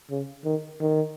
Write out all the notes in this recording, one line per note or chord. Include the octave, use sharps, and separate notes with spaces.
C#3
D#3
D#3